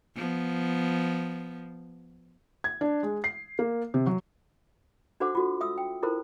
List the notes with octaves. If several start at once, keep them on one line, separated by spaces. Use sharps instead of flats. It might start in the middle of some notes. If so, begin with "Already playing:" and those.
F3 B3
G#6
D4
G#3
C7
A#3
C3
F#3
D4 F#4 A4 C5 F#5 D6
F4 F#4 A4
E5 D#6 E6
G5
E4 F4 A4 A#4 C5